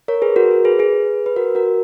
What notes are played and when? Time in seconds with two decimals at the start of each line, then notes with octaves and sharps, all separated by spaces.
0.08 A#4 C#5
0.22 G#4 B4
0.36 F#4 A#4
0.51 G#4
0.65 G#4 B4
0.79 G#4 B4
1.26 B4
1.36 F#4 A#4
1.55 F#4 A#4